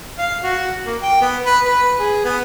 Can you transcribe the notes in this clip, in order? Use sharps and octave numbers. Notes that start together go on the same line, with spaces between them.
F5
F#4
A#3
G5
B3
B4
B4
G#4
B3